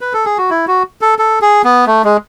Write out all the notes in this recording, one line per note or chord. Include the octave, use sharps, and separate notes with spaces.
B4
A4
G#4
F#4
E4
F#4
A4
A4
G#4
B3
A3
G#3